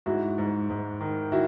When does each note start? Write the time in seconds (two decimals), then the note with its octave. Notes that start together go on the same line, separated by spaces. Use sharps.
0.06 G#2 E4 F#4
0.38 G#2
0.70 G#2
1.01 D#3
1.32 D#3 E4 F#4